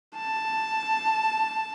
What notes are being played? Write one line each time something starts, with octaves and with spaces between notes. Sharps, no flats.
A5